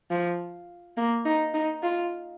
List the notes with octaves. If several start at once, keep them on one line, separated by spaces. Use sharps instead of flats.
F3
A#3
D#4
D#4
F4